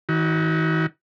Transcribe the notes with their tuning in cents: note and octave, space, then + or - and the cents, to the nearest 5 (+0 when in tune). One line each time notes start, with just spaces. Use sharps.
D#3 +45 F#4 +15